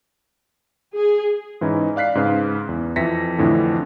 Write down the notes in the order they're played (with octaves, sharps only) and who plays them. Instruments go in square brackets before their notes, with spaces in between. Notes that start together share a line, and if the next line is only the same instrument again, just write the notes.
[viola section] G#4
[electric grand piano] G#2 E3 C#4 D#4 E4
D5 F5 F#6 B6 C7
G#2 C#3 B4 F5
E2
F2 E3 E5 A#6 B6 C#7
F2 A2 D3 E3